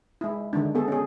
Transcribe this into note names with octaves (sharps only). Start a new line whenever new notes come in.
G#3 E4
D3 D#3 G#3 D4
B3 G#4 A4
C#4 G#4